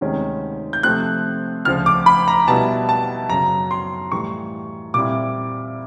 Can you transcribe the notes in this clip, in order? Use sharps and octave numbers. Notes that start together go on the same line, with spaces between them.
D2 C3 D#3 G#3 C#4
G6
C3 F3 A3 C4 F#6
D2 C#3 F3 F6
D6
B5
A#5
B2 G3 B3 E4 A5
A5
F#2 C#3 F#3 A#5
C6
A2 E3 G3 C#6
A#2 G3 C4 E4 D6